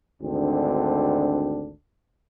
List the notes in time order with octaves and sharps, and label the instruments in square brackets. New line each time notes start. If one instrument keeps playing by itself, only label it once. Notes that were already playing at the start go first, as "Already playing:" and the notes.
[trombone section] G#1 D2 C4 D4